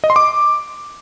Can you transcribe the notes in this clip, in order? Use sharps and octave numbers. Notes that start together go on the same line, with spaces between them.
D#5
C6
D6